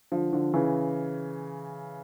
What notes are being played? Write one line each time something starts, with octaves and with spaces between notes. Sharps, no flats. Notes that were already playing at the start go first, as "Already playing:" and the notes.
D3 F3
D3 F3
C#3 E3